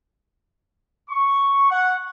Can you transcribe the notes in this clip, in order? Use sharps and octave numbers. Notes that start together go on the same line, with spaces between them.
C#6
F#5